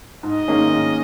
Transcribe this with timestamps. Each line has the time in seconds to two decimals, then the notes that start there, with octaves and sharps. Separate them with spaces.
0.23 G#2 D#5
0.48 D#3 A#3 C#4 G#4
0.72 G#2